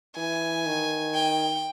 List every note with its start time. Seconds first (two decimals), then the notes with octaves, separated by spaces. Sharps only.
0.17 E3 G#5
0.66 D#3
1.15 G5